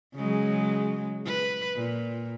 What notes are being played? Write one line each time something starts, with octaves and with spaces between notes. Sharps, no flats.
C#3 F#3 G#3
B4
A#2